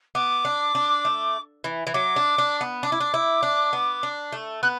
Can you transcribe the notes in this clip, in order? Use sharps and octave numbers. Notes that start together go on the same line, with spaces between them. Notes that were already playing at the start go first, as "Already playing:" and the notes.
B3 D6
D4
D4
A3
E3
E3
F#3 D6
D4
D4
B3
D4 D6
E4
D4
E4
D4
B3
D4
A3
B3 F#6